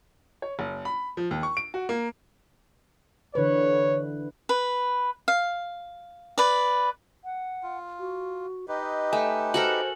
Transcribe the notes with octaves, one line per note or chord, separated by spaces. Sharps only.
C#5
F#1
B5
F3
D#2
C#6
D7
F#4
A#3
D3 E3 B4 C#5
B4
F5
B4 D5
F#5
F4
F#4
D#4 G4 B4 D#5
A3 G#5
F#4 A4 A#4 C5 F#7